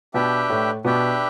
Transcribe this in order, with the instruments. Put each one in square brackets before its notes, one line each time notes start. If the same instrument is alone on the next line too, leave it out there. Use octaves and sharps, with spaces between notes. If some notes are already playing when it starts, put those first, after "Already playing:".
[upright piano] B2 B3 [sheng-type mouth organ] D4 G4 B4 E5 G5
[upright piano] A2 A3
[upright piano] B2 B3 [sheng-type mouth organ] D4 G4 B4 E5 G5